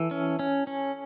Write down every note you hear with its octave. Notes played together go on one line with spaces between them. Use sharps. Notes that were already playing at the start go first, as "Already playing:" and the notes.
Already playing: E3 A4
C#4
C#4
C#4